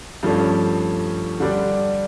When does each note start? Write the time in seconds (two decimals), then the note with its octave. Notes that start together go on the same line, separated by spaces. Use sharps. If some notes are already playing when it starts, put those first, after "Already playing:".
0.23 G2 F3 A3 C#4
1.40 D3 G3 D4